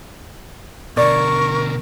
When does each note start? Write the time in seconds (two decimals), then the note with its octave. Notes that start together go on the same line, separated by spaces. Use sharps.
0.97 B2 D3 A#4 D5 C#6